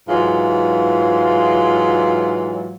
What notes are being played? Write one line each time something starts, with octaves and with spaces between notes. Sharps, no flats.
G#2 E3 F#3 F4